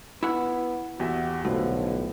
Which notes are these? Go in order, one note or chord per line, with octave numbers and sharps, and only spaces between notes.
B3 E4 F#5
E2 F#4 G4 E5
B1 A2 D3 F3